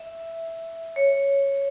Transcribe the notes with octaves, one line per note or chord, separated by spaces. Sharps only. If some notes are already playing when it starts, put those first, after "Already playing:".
Already playing: E5
C#5